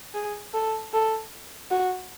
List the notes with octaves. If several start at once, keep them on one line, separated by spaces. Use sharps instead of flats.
G#4
A4
A4
F#4